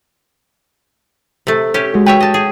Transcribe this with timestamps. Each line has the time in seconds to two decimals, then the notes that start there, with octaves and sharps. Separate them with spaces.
1.47 C3 A3
1.74 C#4 G4
1.94 G#3 F#4
2.06 B4 C#5 E5 G5
2.21 D#5 A5
2.34 G#4